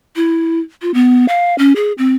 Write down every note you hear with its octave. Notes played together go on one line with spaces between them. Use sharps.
E4
F4
B3
F5
C#4
G#4
C4